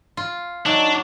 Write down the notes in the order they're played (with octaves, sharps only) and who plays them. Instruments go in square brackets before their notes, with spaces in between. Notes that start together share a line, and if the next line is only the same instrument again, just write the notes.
[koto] F4
[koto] F#3 [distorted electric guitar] D4 [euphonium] D#4